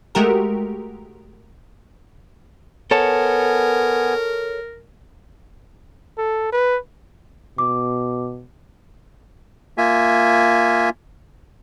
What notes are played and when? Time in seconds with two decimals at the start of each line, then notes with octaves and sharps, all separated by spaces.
0.15 G#3 A3 F#4 G4 A#4
2.91 B3 A4 A#4 C#5 G#5 A5
6.18 A4
6.52 B4
7.58 B2 D6
9.78 A#3 F4 E5 G#5